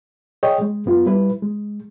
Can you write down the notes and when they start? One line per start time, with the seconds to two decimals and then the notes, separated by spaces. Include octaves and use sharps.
0.43 G#4 C#5 D#5 G5
0.61 G#3
0.86 F#2 B3 F4
1.06 G3 E4 B4
1.42 G#3